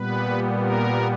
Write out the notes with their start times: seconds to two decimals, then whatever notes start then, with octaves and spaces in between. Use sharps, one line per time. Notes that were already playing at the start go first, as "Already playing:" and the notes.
Already playing: A#2 G3 B3 B4
0.59 A#4